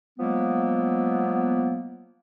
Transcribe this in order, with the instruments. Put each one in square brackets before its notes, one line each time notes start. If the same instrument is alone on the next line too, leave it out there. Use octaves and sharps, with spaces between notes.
[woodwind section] F3 F#3 G#3 A#3 B3